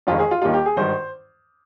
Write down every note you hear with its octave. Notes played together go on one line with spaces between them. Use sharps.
F1 F2 D#3 G#3 F4
G#4
F4
D#2 D#3 G3 A#3 F4
G4
G#4
G#1 G2 D#3 C5